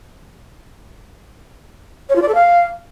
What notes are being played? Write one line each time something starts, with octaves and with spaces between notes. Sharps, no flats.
C#5
F4
D5
A4
F5